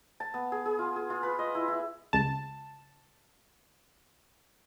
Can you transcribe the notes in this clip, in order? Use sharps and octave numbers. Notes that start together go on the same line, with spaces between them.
A5
B3
G#4
G#4
F4
G#4
F4
B4
D#5
E4
E4
C#2 A5